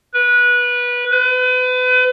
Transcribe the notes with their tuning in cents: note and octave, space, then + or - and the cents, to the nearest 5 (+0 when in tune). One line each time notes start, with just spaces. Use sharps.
B4 -20
B4 +35